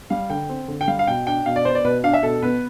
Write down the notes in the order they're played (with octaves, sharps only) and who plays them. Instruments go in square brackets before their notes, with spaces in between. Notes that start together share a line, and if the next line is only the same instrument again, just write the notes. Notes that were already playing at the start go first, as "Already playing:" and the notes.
[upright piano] G3 F5
D3 G5
C4
D3
G5
G3 F5
F5
B2 G5
D4 G5
B2 F5
D5
B3 C5
D5
B2 B4
D4 F5
E5
B2 A4
B3 B4